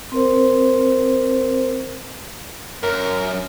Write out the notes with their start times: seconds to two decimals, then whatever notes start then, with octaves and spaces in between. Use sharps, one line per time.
0.12 C4 A#4 C5
2.83 F#2 A#4